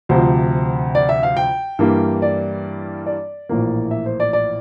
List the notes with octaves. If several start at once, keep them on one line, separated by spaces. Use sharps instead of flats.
D2 C3 F3 C5
D5
E5
F5
G5
G2 E3 G3 A#3
D5
D5
A#1 A2 E3 A#3
E5
C5
D5
D5